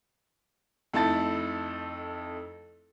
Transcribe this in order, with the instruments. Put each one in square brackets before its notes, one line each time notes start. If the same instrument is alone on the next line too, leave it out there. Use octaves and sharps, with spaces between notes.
[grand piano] F2 A3 D#4 E4 A5 A6